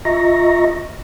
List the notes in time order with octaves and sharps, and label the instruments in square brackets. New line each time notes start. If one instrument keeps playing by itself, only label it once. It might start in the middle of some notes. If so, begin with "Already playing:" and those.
[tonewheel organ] F4 D#5 E5 A#5 C#6 A#6